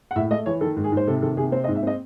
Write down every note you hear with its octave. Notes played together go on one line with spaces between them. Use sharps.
F#5
A2 E5
A3 D#5
E3 C#5
D#3 A4
G#2
G#4
G#2
C5
C3 A4
D#3 A4
C3 G#4
C4 C5
D#5
G#2
E5
C4 D#5